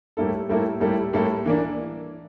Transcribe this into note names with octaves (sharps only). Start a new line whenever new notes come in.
A2 G3 A#3 E4 A4
A2 G3 A#3 E4 A4
A2 G3 A#3 E4 A4
A2 G3 A#3 E4 A4
E3 A#3 D4